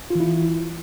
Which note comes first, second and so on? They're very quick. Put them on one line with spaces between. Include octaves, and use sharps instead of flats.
F4 E3 E4